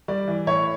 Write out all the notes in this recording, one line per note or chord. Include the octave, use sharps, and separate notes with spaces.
G3 D5
E3
A2 C#5